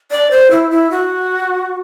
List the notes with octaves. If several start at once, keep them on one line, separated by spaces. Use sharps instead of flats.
D5
C5
E4
E4
F#4